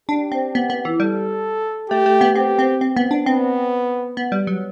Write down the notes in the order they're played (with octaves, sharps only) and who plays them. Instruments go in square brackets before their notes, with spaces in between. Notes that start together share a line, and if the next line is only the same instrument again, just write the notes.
[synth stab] D4 [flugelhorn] G4
[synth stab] C4
B3
B3
E3
[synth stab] G3 [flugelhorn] A4
[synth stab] A3 [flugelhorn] G4
[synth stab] A3
B3
[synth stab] C4 [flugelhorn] G4
[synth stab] C4
C4
B3
D4
[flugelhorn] B3 [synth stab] C4
[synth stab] B3
G3
F#3